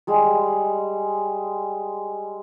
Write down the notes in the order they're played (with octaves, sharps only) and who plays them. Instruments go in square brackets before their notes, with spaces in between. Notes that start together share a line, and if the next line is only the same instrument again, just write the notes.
[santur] G3 G#3